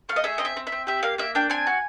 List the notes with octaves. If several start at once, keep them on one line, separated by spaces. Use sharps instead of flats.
A3 F5
D#5
G#4 E5
C4 D#5
E5
C4
E5
C4
G4 E5
A#3 F5
A#3 E5
D4 G5
C4 G#5
F#4